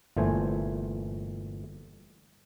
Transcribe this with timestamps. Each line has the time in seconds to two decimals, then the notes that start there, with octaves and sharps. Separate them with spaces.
0.17 G1 A#2 E3 A3 C5 G#5